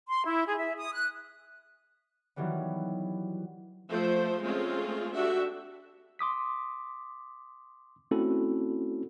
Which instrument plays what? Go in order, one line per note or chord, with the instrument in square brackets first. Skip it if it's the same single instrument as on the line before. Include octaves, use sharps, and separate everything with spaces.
[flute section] C6
E4
G#4
E5
D#6
F#6
[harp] D#3 E3 F#3 G3 B3
[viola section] F3 A3 C5
G#3 A3 C4 C#4 F4 G#4
D4 F#4 G4 A4 E5
[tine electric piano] C6 D6 D#6 B6
A3 C4 C#4 E4 F#4 A4